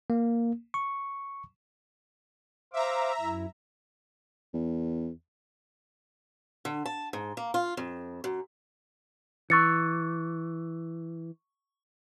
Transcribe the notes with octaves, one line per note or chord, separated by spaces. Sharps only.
A#3
C#6
C5 E5 F5 A#5 D6
F#2 E4
E2
D3
A5
G#2
A#3
F4
F2
F#2
E3 C#6 A6 C#7